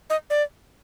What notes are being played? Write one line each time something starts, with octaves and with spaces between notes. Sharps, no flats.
D#5
D5